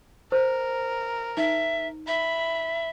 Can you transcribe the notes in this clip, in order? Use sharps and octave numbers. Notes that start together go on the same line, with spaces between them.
A#4 C5
D#4 E5
E5 B5